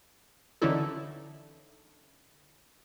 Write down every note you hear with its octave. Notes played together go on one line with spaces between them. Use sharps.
D3 E3 C#4 D#4 E4 A4